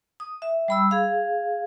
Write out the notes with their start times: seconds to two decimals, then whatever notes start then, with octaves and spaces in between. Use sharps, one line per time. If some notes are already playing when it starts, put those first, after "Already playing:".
0.20 D#6
0.42 E5
0.68 G3 B5 E6
0.91 G#4 F5